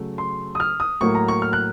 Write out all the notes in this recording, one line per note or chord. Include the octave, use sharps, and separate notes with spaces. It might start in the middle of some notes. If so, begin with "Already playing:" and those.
Already playing: C#3 F#3 A3
C6
D#6
F6
D#6
A2 F#3 A#3 C#6
A#5
C#6
F6
F#6